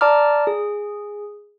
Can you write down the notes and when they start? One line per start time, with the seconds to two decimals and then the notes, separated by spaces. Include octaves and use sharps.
0.01 D5 A5 A#5 D6 F6
0.47 G#4